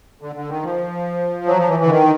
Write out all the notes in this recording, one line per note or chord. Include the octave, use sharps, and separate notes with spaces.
D3
D3
D#3
F3
F#3
F3
E3
E3
D3
D#3